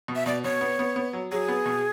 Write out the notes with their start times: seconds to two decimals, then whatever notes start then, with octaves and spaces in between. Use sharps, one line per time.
0.08 B2
0.16 E5
0.26 B2 D5
0.44 B2 C#5
0.61 B3
0.79 B3
0.96 B3
1.13 F#3
1.31 F#3 G#4
1.48 B3
1.66 B2